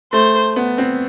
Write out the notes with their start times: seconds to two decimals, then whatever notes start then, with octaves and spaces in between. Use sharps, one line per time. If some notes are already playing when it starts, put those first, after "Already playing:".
0.12 A3 C5
0.56 B3
0.78 C4